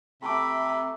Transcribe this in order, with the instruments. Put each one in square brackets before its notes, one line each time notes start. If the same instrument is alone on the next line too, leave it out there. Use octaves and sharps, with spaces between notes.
[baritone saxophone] C3 [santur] A3 D6 [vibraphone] A#5 E6 [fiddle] B5